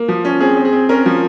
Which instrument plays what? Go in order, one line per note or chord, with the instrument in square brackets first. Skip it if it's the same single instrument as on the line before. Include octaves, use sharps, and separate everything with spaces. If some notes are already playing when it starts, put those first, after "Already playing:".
Already playing: [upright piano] A#3
F3
C#4
C4 G#4
C4
G#4
C4
C#4 A#4
F3